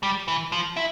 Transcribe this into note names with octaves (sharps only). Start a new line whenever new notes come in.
G3
E3
F3
E4